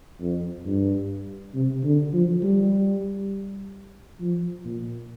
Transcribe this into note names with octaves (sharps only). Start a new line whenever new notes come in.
F2
G2
C3
D3
F3
G3
F3
A#2